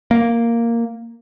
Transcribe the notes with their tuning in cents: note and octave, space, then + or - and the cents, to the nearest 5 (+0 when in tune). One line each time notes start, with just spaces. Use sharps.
A#3 -5